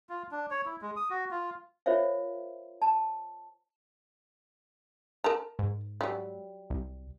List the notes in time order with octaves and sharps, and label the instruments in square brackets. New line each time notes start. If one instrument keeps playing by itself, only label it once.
[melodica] F4
D4
C#5
E4
G#3
D#6
F#4
F4
[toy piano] F4 A#4 C5 C#5 E5 F5
A5
[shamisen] A#4 A5 A#5
[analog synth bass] G#2
[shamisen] F#3 G3
[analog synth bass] C2